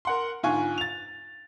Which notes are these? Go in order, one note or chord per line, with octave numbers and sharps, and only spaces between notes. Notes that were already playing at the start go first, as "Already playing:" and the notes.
A#4 F#5 C6
G#2 D3 F4 G#5 C#6
A6 F7